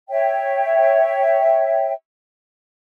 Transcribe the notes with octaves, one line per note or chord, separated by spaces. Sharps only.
C#5 E5 G5